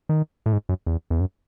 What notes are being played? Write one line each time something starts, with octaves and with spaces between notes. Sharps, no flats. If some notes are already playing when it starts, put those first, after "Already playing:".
D#3
A2
G#2
F#2
E2
E2
F#2